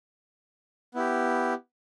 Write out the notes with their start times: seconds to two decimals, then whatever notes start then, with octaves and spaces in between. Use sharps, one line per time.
0.94 B3 E4 G4